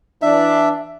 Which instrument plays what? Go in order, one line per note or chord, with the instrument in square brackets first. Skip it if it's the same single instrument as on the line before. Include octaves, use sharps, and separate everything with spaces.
[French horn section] E3 D4 [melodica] E5